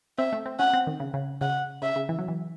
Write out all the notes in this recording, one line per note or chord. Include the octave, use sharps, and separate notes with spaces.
C4 E5
A3
C4
C#4 F#5
C4
D#3
C#3
C#3
C#3 F#5
C#3 E5
C#3
E3
F#3
E3